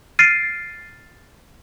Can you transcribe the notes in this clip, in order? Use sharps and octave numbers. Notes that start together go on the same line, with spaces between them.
F6 A6 C7 D7 D#7